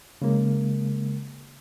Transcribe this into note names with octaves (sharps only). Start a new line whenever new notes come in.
C#3 G#3 A#3